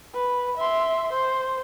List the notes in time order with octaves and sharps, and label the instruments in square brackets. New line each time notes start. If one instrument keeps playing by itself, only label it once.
[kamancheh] B4
E5 C6
C5